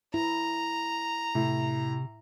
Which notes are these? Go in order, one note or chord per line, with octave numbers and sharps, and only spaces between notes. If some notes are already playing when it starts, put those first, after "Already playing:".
E4 A#5
A2 C3